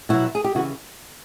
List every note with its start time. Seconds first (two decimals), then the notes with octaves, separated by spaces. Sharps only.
0.09 B2 F#3 E4 F#4
0.35 G#4
0.44 G4
0.55 C#3 E3 E4 F#4